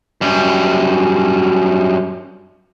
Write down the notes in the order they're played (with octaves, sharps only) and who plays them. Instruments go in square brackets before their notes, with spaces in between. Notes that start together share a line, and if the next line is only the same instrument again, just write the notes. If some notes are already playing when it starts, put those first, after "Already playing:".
[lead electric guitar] F#2 G3